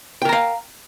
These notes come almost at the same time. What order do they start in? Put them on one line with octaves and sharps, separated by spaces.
G5 A#4 A#5 F5